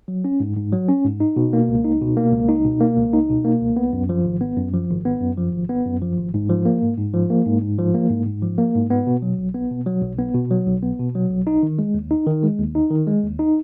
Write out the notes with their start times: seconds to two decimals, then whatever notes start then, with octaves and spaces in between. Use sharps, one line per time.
0.08 F#3
0.25 C#4
0.40 G#2
0.56 G#2
0.73 F#3
0.89 C#4
1.04 G#2
1.20 D#4
1.36 B2
1.53 A#3
1.69 C#2
1.85 D#4
2.01 B2
2.17 A#3
2.33 C#2
2.48 D#4
2.65 B2
2.80 A#3
2.97 C#2
3.13 D#4
3.29 B2
3.45 A#3
3.61 C#2
3.76 B3
3.93 F#2
4.09 F3
4.25 G#1
4.41 B3
4.57 F#2
4.74 F3
4.90 G#1
5.05 B3
5.21 F#2
5.37 F3
5.53 G#1
5.69 B3
5.86 F#2
6.02 F3
6.18 G#1
6.34 G#2
6.50 F3
6.65 A#3
6.82 G#2
6.98 G#2
7.14 F3
7.30 A#3
7.45 G#2
7.62 G#2
7.78 F3
7.94 A#3
8.10 G#2
8.26 G#2
8.42 F3
8.58 A#3
8.75 G#2
8.90 B3
9.07 B2
9.22 F#3
9.38 B1
9.55 B3
9.71 B2
9.86 F#3
10.03 B1
10.18 B3
10.35 B2
10.51 F#3
10.67 B1
10.83 B3
10.99 B2
11.15 F#3
11.31 B1
11.47 D#4
11.63 D#3
11.79 G#3
11.94 D#2
12.11 D#4
12.27 D#3
12.43 G#3
12.59 D#2
12.75 D#4
12.91 D#3
13.07 G#3
13.23 D#2
13.39 D#4